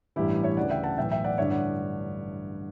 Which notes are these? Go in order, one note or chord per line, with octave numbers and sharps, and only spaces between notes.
A1 G2 E3 E4 G4
C#5 E5
D2 C#3 E3 D5 F#5
E5 G5
F#5 A5
B1 A2 E3 E5 G5
E5 G5
D5 F#5
A1 G2 D3 C#5 E5
D5 F#5